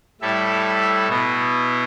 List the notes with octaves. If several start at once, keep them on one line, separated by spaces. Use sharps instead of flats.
A2 G3 E4 A4 E5
B2 B3 E4